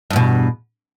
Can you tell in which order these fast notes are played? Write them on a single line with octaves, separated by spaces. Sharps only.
G2 E2 B2